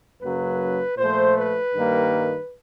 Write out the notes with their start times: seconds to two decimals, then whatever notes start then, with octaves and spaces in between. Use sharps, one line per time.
0.21 F#2 C#3 F#3 A#3 B4
0.97 A#2 F3 A3 C5
1.36 B4
1.74 G2 D#3 G3 A#3